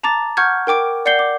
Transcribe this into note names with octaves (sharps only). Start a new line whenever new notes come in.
A5 A#5 D6 A6
F#5 C#6 F6 G6 G#6
A#4 G5 D6 D7
D5 F#5 G6 C7 G7
D6